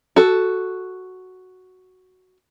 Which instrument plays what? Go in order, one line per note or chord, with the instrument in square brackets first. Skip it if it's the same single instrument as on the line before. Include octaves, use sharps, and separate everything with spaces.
[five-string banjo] F#4 A4